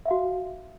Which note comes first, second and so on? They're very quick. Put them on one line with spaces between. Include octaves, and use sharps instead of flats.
E5 F5 F#4